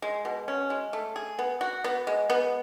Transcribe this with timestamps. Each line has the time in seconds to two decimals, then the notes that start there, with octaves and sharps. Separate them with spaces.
0.02 G#3
0.25 B2
0.48 C#4
0.70 G#3
0.93 A3
1.16 G#4
1.39 B3
1.61 F#4
1.84 B3
2.07 G#3
2.30 B3